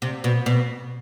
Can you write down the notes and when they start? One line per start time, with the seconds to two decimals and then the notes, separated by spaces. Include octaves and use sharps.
0.02 C3
0.24 B2
0.46 B2